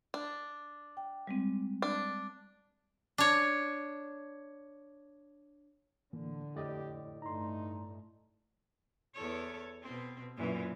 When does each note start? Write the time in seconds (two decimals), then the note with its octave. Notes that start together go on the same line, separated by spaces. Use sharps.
0.14 D4
0.97 G5
1.27 G3 G#3 C4
1.82 D4
3.18 D4 C#5
6.13 A2 D3 E3 A#3
6.56 F2 A2 G4 D5 D#5
7.22 G2 A3 D#4 A#5 C6
9.15 E2 A4 C#5
9.83 B2 C4
10.37 F#2 A#2 E3